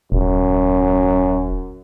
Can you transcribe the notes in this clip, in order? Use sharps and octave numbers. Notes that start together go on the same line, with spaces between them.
D#1 F#2